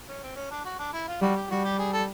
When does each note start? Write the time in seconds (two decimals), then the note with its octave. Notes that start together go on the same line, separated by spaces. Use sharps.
0.08 C#4
0.23 C4
0.36 C#4
0.51 D4
0.65 F#4
0.79 D4
0.93 E4
1.08 F4
1.22 G3 F#4
1.36 G4
1.50 G3 F#4
1.64 G4
1.79 G#4
1.93 A4